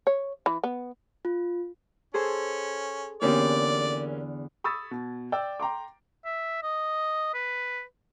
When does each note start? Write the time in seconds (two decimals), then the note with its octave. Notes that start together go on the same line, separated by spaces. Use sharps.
0.07 C#5
0.46 E3
0.64 B3
1.25 F4
2.14 C#4 G#4 A4 C5
3.22 E2 D3 A#3 B3 C#4 G4 D5
4.64 B5 C#6 D#6 E6 G#6 A6
4.91 B2
5.32 D5 G5 E6
5.60 G5 A#5 C6 D6
6.25 E5
6.63 D#5
7.34 B4